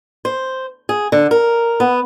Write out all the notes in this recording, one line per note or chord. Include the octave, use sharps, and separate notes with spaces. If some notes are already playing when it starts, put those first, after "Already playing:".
C5
G#4
D3
A#4
B3